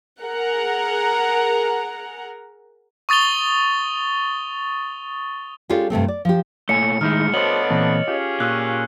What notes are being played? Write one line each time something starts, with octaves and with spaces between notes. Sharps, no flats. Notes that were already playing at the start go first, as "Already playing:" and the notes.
G#4 A#4 F#5 A#5
C#6 D#6 A6 F7 G7
G#3 C#4 D4 F4 G4 A4
G2 C3 A3 C4
D5
F3 G4
A#2 A3 C#5 G#5 C#7
A2 D#3 G#3 D#4 E4 F6
A3 B3 D4 F#4 C5 C#5 D#5 F#7
A#2 E3 C4
C#4 F4 G4 G#4
A#2 C#6 E6 F#6